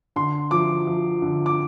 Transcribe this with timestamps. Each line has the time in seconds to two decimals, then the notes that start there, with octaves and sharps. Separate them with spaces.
0.16 D3 C6
0.51 F3 D6
0.87 F3
1.22 D3
1.46 D6